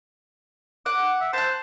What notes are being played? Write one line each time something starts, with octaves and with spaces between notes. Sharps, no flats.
F#5 D6
E5
C5 A5 F#6